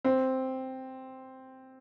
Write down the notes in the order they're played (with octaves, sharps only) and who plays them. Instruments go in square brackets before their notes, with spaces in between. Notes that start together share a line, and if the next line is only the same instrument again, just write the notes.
[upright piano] C4